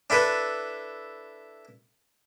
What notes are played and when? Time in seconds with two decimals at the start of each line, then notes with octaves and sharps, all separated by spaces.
0.10 D4 E4 A4 B4